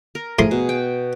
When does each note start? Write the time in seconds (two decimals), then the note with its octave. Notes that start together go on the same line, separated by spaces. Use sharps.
0.15 A#4
0.39 A2 F3 G#4 C6
0.51 B2
0.69 G5